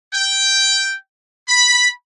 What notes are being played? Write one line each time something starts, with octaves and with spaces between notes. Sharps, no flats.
G5
B5